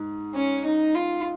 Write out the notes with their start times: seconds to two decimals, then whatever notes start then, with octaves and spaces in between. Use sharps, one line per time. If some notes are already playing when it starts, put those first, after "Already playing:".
Already playing: G#2
0.34 C#4
0.65 D#4
0.95 F4